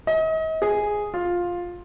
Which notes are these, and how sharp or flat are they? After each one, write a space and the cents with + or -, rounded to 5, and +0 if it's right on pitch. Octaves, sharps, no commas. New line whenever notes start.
D#5 +40
G#4 +0
F4 +10